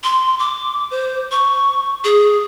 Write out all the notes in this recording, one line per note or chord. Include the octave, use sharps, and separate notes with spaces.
C6
D6
C5
C#6
G#4